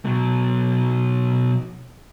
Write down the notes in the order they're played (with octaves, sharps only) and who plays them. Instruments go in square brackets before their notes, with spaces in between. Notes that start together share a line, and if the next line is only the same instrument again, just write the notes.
[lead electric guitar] B2 F#3